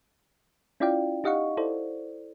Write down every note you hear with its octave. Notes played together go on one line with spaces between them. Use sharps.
C#4 E4 F4 D5 F5 G5
D#4 G4 D#5 F5 F#5 C#6
E4 A4 C5 D5